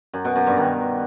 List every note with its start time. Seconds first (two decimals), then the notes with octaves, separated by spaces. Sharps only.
0.13 F#2
0.25 B2
0.36 F#2
0.47 G2
0.58 D#3